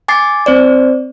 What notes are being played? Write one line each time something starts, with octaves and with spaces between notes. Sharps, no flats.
G#5 D6 A6 C7
C4 C5 D5